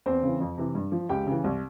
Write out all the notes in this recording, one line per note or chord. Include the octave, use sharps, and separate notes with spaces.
E2 C4 C5
C#3 E3
F2
C3 E3
G2
F3
C#2 G4 G5
C#3 E3
C2